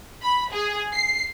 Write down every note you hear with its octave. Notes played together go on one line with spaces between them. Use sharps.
B5
G#4
C7